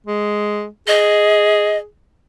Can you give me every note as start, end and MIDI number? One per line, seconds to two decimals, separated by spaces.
0.06 0.67 56
0.88 1.85 68
0.88 1.78 75